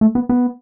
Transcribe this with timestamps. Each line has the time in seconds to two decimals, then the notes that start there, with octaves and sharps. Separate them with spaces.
0.01 A3
0.15 B3
0.29 B3